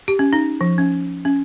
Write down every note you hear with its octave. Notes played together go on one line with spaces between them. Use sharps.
G4
C#4
D#4
F3
C#4
C#4